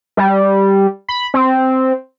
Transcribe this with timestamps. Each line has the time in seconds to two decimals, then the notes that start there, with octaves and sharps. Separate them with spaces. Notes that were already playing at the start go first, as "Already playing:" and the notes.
0.17 G3
1.09 B5
1.34 C4